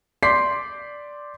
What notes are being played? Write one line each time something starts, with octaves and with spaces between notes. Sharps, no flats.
D5 C6 D6 G6 B6 C7